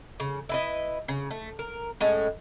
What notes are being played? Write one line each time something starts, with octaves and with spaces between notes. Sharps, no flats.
C#3
E4 B4 D#5
C#3
A3
A#4
A2 G#3 C#4